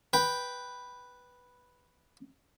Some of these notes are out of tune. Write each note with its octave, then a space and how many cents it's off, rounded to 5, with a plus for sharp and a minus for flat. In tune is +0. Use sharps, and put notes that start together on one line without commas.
B4 +0 G5 +0